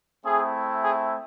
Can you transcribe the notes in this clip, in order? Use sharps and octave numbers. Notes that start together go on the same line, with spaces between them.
A3 C4 E4 G#4
G#4